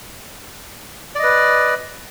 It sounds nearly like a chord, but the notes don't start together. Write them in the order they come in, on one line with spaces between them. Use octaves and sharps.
D5 D#5 B4